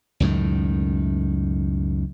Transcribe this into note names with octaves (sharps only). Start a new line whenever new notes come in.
C#2 F#2 A2 D#3